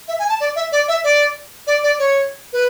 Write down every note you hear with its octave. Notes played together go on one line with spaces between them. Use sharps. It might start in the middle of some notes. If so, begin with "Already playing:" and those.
E5
G#5
A5
D5
E5
D5
E5
D5
D5
D5
C#5
B4